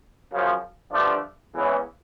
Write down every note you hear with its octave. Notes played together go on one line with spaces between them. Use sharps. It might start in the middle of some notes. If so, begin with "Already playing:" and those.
F#2 C#3 F3
G2 D3 F3 A3 D4
E2 C#3 E3 G#3 C#4